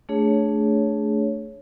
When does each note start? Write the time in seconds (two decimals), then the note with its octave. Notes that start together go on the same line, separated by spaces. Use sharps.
0.09 A3 D4 G#4 C#5